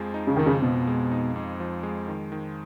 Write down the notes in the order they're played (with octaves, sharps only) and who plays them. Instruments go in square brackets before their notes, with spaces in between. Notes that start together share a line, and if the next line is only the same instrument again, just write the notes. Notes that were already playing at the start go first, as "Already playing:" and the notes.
Already playing: [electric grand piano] F2 F3 G#3
D#4
[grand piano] C#3
[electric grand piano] F2 [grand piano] D#3
[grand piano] C#3
[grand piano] B2 [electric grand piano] F3
[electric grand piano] G#3
D#4
F2
F3
G#3
D#3
D#3